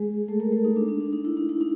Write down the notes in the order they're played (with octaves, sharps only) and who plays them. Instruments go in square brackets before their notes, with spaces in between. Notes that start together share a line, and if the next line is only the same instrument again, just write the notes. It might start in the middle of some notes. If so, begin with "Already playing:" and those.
Already playing: [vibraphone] G#3 G#4
A3 A4
A#3 A#4
A3 A4
D#4
D4
D4
D#4
D#4
E4
D#4
E4
D#4